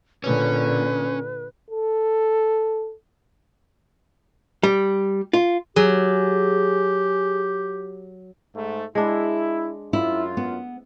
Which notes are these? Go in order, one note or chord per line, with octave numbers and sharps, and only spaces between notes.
A#2 D3 C#4 B4 C#5
A4
G3
F4
F#3 G4 G#4
G#2 A3
G#3 D4 E4
F#2 E4 F4
B3